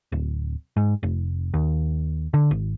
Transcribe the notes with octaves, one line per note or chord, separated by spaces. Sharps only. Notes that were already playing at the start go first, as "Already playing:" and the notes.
D1
G#2
F1
D#2
D3
G#1